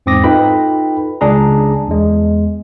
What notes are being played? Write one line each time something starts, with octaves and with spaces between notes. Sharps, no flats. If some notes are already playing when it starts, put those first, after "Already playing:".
E2 G#2 C4 D6 D#6 A#6
D#4 F4 A4 B4 G5 B5
C#2 D4 G#4 A#5
E2 G#3